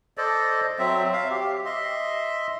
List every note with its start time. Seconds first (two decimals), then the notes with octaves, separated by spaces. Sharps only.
0.18 A4 C5 D5 D#5
0.79 F#3 C4 E5
1.13 E5 F5
1.30 G4
1.66 D#5 E5 C6